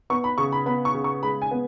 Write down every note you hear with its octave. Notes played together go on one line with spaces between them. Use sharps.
B3 C#6
B5
C#3 C#6
B5
B3 B5
C#6
C#3
C#6
G#3 B5
G#5
B3